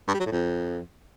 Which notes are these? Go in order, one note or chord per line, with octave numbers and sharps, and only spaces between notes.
G2
G3
F#3
A2
F2